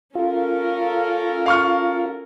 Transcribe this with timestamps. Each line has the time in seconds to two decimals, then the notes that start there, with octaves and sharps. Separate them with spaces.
0.15 C#4 F4 A4 A#4
1.46 F5 C#6 F6